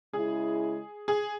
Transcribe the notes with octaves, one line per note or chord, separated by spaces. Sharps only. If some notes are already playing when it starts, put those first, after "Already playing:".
C#3 G#3 E4 G#4
G#4